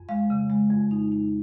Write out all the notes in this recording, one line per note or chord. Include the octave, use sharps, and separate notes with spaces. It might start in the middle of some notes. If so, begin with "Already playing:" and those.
Already playing: F2
G#3 F5
C#3
G#3
F2
D#4
D#4